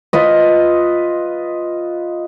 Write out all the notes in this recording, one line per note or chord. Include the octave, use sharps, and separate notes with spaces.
F4 B4 D#5